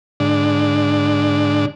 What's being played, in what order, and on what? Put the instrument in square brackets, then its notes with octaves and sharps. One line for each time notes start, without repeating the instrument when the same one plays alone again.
[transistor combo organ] G#2 D3 D4